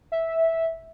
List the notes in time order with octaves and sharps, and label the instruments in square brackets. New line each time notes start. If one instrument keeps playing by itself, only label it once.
[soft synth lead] E5